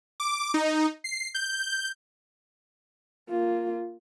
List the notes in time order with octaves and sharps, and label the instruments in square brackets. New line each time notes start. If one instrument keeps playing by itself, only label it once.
[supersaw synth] D6
D#4
C7
G6
[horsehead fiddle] A#3 F4